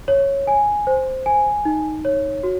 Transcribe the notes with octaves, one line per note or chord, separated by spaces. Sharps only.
C#5
G#5
C5
G#5
D#4
C#5
F#4